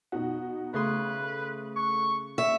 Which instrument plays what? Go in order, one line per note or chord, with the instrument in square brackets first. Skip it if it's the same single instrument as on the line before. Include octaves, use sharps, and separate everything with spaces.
[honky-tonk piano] B2 D#4 F#4
[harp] C#3 G#4 C6 [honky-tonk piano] A3 [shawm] B4
[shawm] C#6
[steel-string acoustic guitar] E5 [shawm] C#6